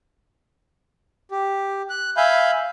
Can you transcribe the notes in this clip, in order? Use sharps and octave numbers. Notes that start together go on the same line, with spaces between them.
G4
F#6
E5 F5 G#5 B5 G6